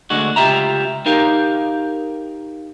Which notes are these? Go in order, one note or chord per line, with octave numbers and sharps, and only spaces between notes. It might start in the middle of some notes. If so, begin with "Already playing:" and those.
D2 D3 G#3 F#4
C#2 F4 G4 E5 A#5
D#4 G4 A#4 F5